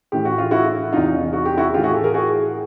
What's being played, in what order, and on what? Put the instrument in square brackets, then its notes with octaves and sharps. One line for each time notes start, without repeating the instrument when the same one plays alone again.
[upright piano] A2 E3 G4
F#4
F4
E4 F#4
E2 C3 E3 D#4 F4
F#4
G4
E4 F#4
E3 F4 G4
A2
F#4 G#4
G4 A4
G#4 A#4
F#4 G#4